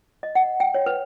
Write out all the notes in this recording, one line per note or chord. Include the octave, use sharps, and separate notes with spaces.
D#5
F#5
G5
C#5
B4